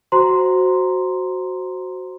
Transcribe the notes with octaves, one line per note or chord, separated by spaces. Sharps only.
F#4 C5 A#5 C6